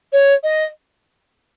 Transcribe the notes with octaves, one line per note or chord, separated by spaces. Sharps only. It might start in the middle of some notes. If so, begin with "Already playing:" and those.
C#5
D#5